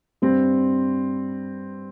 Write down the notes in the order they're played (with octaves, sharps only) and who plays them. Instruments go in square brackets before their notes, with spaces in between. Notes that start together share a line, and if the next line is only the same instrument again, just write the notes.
[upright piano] G2 G3 C4